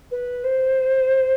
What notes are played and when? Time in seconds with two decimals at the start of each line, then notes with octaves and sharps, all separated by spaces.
0.11 B4
0.43 C5